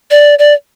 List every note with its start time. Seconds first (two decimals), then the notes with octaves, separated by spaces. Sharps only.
0.11 D5
0.39 D5